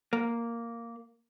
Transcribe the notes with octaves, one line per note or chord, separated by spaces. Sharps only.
A#3